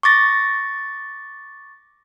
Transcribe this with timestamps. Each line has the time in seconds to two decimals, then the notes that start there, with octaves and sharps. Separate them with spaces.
0.03 C#6 D6 A6 A#6